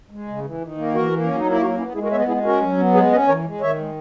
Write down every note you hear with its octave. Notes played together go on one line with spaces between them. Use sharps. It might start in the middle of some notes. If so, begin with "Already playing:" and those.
G#3
C#3
E3
D#3
A#3
E3 F#4 A#4
A#3
F#3 C#4
D#4
A#3 E4
F#3 D#4 F#4
B3 C#4 E4
G#3 E4 G#4
F#4 A#4
B3 C#5 E5
B4 D#5
G#3 E4 G#4
C#4 F#4 A#4
F#3
B3
G#3 G#4 B4
C#4 B4 D#5
E3 A#4 C#5
G#3
D#3 C#5 E5
G#3